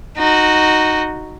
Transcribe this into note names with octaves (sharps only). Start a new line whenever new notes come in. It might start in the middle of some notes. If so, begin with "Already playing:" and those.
D#4 F#4